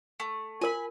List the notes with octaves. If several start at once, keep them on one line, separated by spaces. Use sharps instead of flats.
A3
F4 A#4 G#5 B5